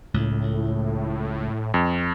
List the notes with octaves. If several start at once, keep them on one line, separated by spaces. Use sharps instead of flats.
C#2 A2
F2